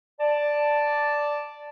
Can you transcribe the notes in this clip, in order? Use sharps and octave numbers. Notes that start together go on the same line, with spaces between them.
D5 A5